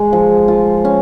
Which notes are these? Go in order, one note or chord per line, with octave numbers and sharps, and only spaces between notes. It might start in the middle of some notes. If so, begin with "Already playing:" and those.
Already playing: G#3
F3
F4
C#4